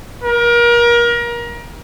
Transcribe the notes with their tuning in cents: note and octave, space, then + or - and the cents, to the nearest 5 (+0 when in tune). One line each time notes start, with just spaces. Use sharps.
A#4 +30